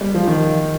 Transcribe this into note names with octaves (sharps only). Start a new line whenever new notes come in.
G3
F3
D#3